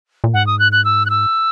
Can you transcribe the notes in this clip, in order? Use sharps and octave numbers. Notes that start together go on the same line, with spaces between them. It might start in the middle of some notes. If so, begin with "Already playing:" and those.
A#2
G#2 F#5
D#6
F#6
F#6
E6
F#6
E6